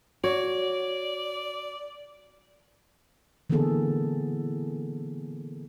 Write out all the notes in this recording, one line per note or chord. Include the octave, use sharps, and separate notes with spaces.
F#4 C#5 D5
D3 E3 A#3 B3 G#4 A4